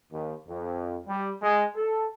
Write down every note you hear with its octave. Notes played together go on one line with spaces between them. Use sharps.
D#2
F2
G3
G#3
A4